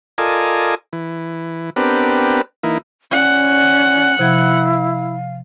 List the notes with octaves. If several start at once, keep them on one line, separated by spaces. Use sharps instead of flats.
F4 A4 A#4 D5 D#5 G#5
E3
B3 C4 D4 G4 A#4 B4
E3 A#3 D#4 E4
C#4 D5 F#5
C3 F3 E4 F5 G#6